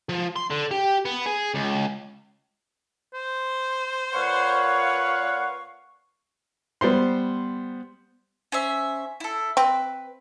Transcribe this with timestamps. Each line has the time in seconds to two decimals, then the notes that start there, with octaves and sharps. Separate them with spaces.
0.09 F3
0.36 C6
0.51 D3
0.71 G4
1.05 B3
1.26 G#4
1.54 C#2
3.14 C5
4.13 A#2 B4 C#5 F5 F#5 C#6
6.81 G3 B3 C5 C6
8.52 C#4 C5 E5
9.20 E4 A4
9.57 C4 B4